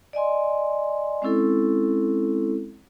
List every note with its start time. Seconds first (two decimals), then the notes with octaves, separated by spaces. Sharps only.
0.13 D5 D#5 G#5 C6
1.22 G#3 C4 C#4 E4 A4